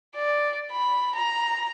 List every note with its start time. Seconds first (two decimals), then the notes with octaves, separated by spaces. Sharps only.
0.16 D5
0.71 B5
1.15 A#5